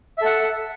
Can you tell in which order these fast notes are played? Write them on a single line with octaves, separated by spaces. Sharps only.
E5 A4 F#5